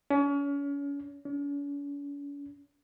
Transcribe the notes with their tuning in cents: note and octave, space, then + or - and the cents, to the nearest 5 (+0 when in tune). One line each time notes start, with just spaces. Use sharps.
C#4 +35
C#4 +45